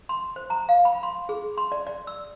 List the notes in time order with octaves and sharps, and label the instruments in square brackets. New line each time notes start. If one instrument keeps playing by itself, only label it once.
[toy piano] C6
C5
A#5
F5
B5
C6
G#4
C6
D5
D5
E6